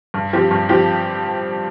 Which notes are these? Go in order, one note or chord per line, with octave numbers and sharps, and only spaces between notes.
G2
F3 C4 G4
G2
F3 C4 G4